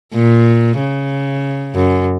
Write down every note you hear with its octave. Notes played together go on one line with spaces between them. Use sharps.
A#2
C#3
F#2